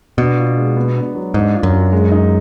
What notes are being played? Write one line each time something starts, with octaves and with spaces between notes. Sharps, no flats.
B2 D4
F4
G#3
B3
D4
F#3
G#2 D4
F4
F#2
F#3
G#3
D#4